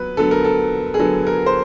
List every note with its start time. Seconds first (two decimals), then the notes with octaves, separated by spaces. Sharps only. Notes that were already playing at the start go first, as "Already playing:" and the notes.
Already playing: F#3 B3 B4
0.17 D3 F#3 B3 A4
0.31 A#4
0.45 A4
0.94 G#4
0.99 D3 F#3 B3 A4
1.27 A#4
1.46 C5